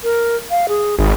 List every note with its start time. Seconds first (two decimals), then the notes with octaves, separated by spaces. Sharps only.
0.04 A#4
0.50 F5
0.69 G#4
0.98 G#1 G#4